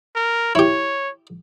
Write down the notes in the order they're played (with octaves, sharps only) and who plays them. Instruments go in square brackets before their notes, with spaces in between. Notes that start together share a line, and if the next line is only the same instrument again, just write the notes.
[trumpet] A#4
[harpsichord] E4 G4 [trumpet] C#5